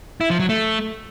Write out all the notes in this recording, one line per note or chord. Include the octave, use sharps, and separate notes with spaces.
E4
F3
F#3
A3